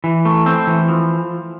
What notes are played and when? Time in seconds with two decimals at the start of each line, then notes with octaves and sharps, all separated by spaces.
0.04 E3
0.25 A3
0.46 C4
0.67 E3
0.88 F3